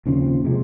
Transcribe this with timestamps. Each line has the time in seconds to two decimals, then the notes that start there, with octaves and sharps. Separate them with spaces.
0.06 D#2 C#3 F3 C4
0.45 C3 F3 G#3